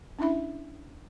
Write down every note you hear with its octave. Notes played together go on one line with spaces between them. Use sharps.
C#4 D4 E4 E5 B5